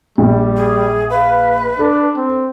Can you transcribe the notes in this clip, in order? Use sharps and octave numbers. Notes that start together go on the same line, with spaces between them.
A#1 G3
G#4
B4 F5
D4 A4
C4